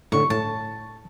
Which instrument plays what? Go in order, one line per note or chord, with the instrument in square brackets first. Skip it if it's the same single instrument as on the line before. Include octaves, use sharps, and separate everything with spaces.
[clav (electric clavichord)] A2 D3 [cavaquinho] C#6
[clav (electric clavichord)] A2 [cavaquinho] A5